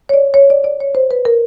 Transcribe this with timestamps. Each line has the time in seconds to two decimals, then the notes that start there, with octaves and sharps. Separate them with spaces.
0.09 C#5
0.14 D5
0.34 C#5
0.50 D5
0.64 D5
0.80 C#5
0.95 C5
1.11 B4
1.25 A#4